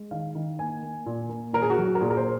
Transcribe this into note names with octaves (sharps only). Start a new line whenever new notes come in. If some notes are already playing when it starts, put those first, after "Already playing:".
Already playing: G#3
D#3 F5
D#3
A#3 G#5
A#3
A#2
A#3
A#2 A#4
G#4
F#4
F#3
F#4
A#4
A#2 G#4
A#4
C5